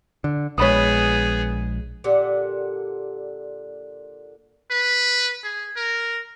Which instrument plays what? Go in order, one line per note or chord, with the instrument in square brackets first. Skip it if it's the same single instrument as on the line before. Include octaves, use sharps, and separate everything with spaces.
[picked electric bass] D3
[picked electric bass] A#1 G#3 [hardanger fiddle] B3 G#4 [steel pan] C#5 B5 D#6
[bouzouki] A#2 D3 G4 F#5
[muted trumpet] B4
G#4
A#4